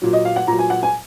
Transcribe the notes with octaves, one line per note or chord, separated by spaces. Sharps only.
A#2 F#3
D#5
F5
F#5
A#2 F#3 A#5
G#5
F#5
G#5